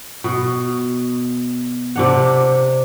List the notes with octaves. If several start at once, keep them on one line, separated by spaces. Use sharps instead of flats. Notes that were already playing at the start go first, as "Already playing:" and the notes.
B2
C3 D4 F#5